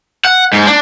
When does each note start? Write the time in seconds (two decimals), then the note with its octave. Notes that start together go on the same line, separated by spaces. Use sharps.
0.25 F#5
0.53 G#2
0.67 D4